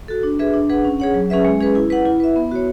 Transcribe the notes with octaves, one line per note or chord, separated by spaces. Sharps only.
F#4 A4
D4
G#4 B4 E5
D4
G#4 B4 F#5
C#4
G#4 C#5 F#5
F#3
C#4 G#4 B4 E5
G#3
C#4 G#4 B4
E4
B4 F#5
E4
B4 E5
B3
F#4 C#5